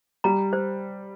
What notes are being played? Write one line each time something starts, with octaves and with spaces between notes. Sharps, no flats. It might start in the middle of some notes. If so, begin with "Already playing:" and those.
G3 A#5
C5